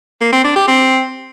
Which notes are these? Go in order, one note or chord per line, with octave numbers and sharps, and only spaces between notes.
A#3
C4
D4
G4
C4